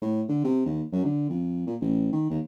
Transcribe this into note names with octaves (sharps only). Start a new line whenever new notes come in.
A2
D3
C3
D#2
F#2
D3
F2
A#2
A1
D#3
D#2